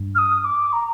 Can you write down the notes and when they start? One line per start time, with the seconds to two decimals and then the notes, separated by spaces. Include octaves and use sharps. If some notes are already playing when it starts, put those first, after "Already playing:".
Already playing: G2
0.15 F6
0.18 D#6
0.44 D6
0.73 A#5